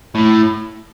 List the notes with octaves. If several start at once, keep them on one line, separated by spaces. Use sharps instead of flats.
A2